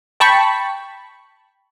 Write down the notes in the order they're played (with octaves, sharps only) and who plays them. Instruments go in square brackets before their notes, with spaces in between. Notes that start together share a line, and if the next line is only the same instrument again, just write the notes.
[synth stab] G5 A5 B5 C#6